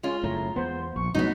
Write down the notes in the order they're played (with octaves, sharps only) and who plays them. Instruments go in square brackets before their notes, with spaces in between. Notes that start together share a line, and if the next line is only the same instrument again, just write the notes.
[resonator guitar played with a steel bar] G#3 F4 [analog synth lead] C#4
[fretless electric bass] F#1 A2 [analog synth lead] A#5
[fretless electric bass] E2 B3 [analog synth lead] C5
[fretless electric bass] A#1 [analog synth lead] C#6
[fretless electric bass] C2 A2 C#4 [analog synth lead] F#3 [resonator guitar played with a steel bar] B3 D#4